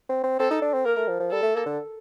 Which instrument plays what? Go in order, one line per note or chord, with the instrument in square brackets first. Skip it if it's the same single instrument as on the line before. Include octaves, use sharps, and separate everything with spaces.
[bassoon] C4
C4
[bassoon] C4 [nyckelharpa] A4
[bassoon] D#4
D4
C4
[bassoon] A#3 [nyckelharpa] A#4
[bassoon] A3
F3
F3
[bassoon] G3 [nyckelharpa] A4
[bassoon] A3
A#3
D3